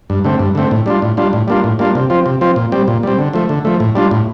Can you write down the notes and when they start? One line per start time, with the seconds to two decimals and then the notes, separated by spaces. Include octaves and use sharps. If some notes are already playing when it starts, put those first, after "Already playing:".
0.10 G2
0.24 D3 A3 C4
0.39 G2
0.55 D3 A3 C4
0.71 A2
0.86 G3 D4 F4
1.02 A2
1.17 G3 D4 F4
1.33 A2
1.48 G3 A#3 D4 F4
1.64 A2
1.79 G3 A#3 D4 F4
1.95 C3
2.10 F3 C4 F4
2.26 C3
2.41 F3 C4 F4
2.56 A#2
2.72 G3 C4
2.88 A#2
3.03 G3 C4
3.19 D3
3.33 F3 A3
3.49 D3
3.65 F3 A3
3.80 A2
3.95 G3 D4 F4
4.11 A2